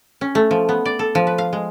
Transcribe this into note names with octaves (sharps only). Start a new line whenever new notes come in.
C#4
A3
F3
B3
D5
A4
F3
B4
F5
G#3